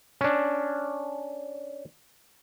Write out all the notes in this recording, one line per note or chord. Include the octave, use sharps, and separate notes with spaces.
C#4 D4